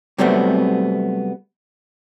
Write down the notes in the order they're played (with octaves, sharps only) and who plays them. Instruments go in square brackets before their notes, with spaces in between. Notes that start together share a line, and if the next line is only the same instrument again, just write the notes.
[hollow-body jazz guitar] C3 F#3 G3 A3 B3 C4